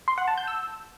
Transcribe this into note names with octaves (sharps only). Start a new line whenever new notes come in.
C6
F#5
A5
G6
E6